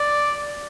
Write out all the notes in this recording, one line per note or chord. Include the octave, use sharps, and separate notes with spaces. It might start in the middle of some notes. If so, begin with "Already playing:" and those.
Already playing: D5